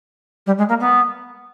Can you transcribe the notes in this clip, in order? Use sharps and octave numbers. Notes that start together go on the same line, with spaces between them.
G3
G#3
A#3
B3